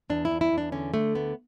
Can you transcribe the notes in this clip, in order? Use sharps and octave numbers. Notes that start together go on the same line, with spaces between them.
E2 D4
E4
E2
E4
E2
D4
D3 C#4
D3 A3
D2 B3